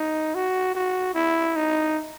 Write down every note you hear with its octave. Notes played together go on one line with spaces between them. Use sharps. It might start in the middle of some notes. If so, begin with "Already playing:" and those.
Already playing: D#4
F#4
F#4
E4
D#4